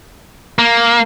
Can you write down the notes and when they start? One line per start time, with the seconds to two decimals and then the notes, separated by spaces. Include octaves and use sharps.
0.59 A#3